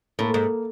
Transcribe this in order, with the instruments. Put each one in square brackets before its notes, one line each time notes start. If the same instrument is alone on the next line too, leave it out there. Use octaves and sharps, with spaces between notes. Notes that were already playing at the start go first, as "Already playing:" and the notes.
[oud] A2 [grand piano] A#3
[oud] G#2